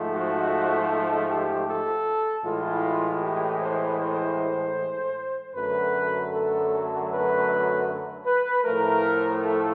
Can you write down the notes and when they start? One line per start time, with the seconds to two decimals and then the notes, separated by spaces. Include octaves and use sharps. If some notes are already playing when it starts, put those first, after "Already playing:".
Already playing: G#2 F3 A3
0.12 F#4
1.29 G4
1.67 A4
2.44 A2 E3 G#3 F4
3.22 G4
3.61 C5
3.99 C5
5.54 F#2 D3 F#3 A3 B4
6.32 A4
7.11 B4
8.26 B4
8.64 A2 F3 A3 A#4
9.43 A4